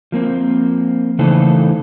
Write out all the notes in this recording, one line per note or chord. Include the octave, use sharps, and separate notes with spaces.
F3 A#3 C4
C#3 E3 A3 D#4 A4 C5